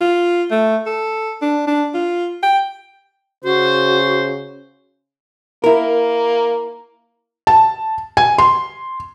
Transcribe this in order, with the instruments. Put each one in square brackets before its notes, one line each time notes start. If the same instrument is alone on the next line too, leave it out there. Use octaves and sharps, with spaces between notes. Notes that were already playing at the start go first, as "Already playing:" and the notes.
[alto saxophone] F4
A3
A4
D4
D4
F4
G5
[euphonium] C#3 [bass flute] F#4 [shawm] C5
[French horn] A#3 [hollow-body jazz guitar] E4 A#4
[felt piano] A5
G#5
C6